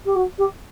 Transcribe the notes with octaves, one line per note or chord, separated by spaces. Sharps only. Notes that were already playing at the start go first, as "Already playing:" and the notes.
G4
F#4
G4